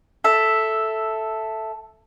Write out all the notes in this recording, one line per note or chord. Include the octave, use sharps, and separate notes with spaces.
A4 E5